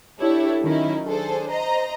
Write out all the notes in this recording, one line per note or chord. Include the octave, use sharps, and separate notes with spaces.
D4 E4 G4 A4 C#5
D#3 F#3 C#4 D#4 E4
D4 G#4 A4 C5
C5 D#5 A#5